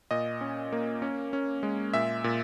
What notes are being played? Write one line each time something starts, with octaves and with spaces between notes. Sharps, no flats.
A#2 D#5
C#4
A#3
C#4
C#4
G#3
A#2 E5
A#2